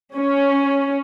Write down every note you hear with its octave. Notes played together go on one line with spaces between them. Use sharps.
C#4